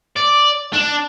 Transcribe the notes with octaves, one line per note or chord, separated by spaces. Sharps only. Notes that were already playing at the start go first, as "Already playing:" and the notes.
D5
D4